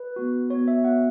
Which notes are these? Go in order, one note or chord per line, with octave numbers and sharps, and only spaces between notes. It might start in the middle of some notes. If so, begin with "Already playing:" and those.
Already playing: B4
B3 F#4
B3 F#4 C#5
E5
B3 F#4 F#5